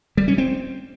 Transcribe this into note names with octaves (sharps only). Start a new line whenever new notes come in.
G3
C#4
C4